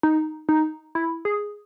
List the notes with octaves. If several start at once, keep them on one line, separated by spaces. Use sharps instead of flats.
D#4
D#4
E4
G#4